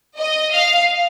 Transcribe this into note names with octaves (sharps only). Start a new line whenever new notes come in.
D#5
F5